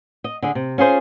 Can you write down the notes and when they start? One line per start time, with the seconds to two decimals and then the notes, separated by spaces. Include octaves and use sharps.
0.24 D#5
0.42 D3 G#4
0.55 C3
0.78 C#4 F4 G#4 C5